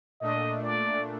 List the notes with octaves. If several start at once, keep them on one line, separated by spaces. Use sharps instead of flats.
A#2 A3 D4 D#5
D5